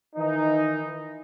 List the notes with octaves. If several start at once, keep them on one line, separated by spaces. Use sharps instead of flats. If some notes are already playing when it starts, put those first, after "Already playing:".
D#3 E3 D#4